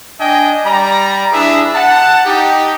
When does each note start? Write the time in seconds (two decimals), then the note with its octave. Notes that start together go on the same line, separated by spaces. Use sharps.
0.20 D4 D#5 G5 G#5
0.65 G3 D5 A#5
1.32 D4 E4 G#4 B4 E5
1.74 F#5 A5
2.25 D#4 G4